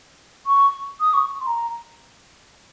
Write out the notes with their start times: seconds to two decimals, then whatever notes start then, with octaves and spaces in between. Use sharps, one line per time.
0.46 C#6
1.00 D#6
1.14 C#6
1.41 C6
1.47 A#5